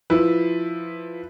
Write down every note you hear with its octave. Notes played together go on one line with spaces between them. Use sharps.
F3 E4 B4